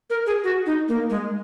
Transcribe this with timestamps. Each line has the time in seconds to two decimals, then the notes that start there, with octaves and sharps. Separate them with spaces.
0.10 A#4
0.26 G#4
0.44 F#4
0.66 D#4
0.88 A#3
1.10 G#3